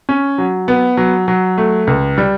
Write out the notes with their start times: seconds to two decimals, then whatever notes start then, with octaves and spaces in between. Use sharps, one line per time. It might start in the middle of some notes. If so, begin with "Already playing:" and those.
0.09 C#4
0.38 F#3
0.68 B3
0.97 F#3
1.28 F#3
1.58 A3
1.87 C#2
2.18 G3